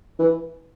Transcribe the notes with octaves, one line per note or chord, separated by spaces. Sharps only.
E3